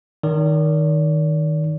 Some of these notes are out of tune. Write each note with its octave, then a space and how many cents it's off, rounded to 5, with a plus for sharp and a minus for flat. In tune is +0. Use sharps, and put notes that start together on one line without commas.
D#3 +0 D5 -40